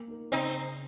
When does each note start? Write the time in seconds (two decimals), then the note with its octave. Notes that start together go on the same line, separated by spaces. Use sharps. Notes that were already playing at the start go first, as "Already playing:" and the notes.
Already playing: A#3
0.08 D#4 A#4
0.32 C#3 C4 D#4